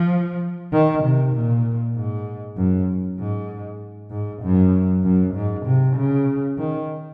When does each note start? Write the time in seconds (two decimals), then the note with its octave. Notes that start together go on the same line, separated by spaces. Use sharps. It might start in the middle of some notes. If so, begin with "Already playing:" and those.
Already playing: F3
0.72 D#3
1.03 C3
1.34 A#2
1.95 G#2
2.57 F#2
3.19 G#2
4.11 G#2
4.43 F#2
5.03 F#2
5.34 G#2
5.66 C3
5.96 C#3
6.58 D#3